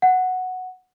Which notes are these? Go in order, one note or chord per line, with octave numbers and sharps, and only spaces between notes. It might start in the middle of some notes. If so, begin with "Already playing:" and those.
F#5